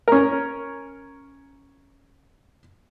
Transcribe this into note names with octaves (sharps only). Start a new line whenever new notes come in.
C#4 A#4